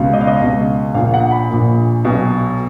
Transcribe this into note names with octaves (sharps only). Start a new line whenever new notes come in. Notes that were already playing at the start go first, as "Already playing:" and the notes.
Already playing: C#2 B2
D#5
F5
D#5
C#2 B2
A#1 A#2 F5
F#5
B5
A#1 A#2
B1 B2